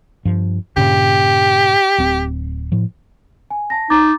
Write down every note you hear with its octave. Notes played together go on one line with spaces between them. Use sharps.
G2 F3
G2 A#2 C#3 G4
D1 C4
A2 F3
G#5
A5 A#6
D#4 A#5 D6 A6